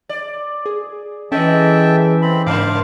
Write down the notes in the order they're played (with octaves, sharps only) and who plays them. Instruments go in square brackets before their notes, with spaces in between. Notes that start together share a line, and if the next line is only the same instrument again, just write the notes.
[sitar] D5
[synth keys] G#4
[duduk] E3 [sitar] G#3 D#5 [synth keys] C#4 A4 [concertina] E5 G5 A5
[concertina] C4 B5
[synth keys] G#2 [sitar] C#3 A#3 C5 [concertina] F5 D6